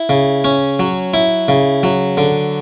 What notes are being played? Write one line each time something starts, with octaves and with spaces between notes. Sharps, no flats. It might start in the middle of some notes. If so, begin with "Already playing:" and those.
Already playing: E4
C#3
C#4
F#3
E4
C#3
F#3
D3